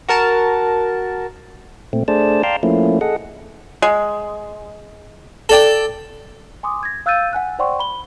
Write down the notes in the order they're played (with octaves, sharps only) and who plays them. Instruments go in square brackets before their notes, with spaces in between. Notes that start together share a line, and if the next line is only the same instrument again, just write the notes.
[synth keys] F#4 A#4 A5
[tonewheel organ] A#2 A3 C4
A3 D4 G#4 C5 D5 A5
D5 F5 G5 A5 A#5 C6
F3 A3 A#3 C#4 E4
G#4 A4 D#5 F#5
[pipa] G#3
[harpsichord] A4 D5 G5
[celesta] G#5 C6 D6 D#6
G#6 A#6
F5 E6 F#6 G6 A6 D#7
F#5 G#5 F#6
C5 D5 F#5 G5 C6 C#6
B5 G7